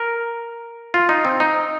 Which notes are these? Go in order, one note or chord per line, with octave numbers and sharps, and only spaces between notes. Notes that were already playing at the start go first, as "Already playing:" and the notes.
Already playing: A#4
F4
D#4
C4
D#4